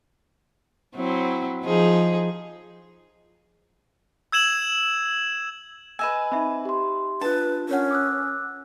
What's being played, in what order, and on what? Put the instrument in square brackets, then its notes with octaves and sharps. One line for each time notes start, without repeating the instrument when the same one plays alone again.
[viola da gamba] F#3 C4 E4
F3 D#4 G#4
[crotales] E6 G#6 E7 F#7
[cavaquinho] B4 D#5 G#5 [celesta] E6 E7
[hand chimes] C4 [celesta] D#4 E5 B5
[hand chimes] G4 C6
[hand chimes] D4 F4 [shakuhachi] B4 [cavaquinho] A5
[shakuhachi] C#4 [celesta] A#4 C#5 F#5
[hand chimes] D6 E6 F#6